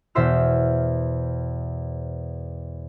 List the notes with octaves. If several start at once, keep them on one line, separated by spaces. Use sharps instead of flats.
E2 B2 C5 E5 C6 F6